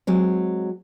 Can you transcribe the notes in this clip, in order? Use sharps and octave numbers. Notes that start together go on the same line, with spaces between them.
F#3 G#3 C4